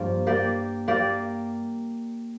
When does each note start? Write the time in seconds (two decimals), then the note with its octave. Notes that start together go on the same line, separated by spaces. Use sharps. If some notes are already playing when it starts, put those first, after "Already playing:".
Already playing: G2 F3 A#3
0.27 A#3 G4 D5
0.88 A#3 G4 D5